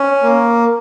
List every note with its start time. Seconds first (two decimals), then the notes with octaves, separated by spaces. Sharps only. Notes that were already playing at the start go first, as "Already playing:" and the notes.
Already playing: C#4
0.22 A#3